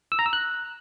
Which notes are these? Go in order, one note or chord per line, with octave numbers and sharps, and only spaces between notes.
E6
A#5
E6
F#6